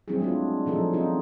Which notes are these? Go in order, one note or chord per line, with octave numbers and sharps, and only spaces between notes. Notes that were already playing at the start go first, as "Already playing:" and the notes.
F#3 G3 C4 D4 E4 G#4
G#3 A3 C4 D4 F4
A#2 F3 F#3 D#4 G#4 A4
C4 C#4 D#4 F4